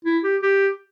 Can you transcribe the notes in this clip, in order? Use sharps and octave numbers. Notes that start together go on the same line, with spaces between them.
E4
G4
G4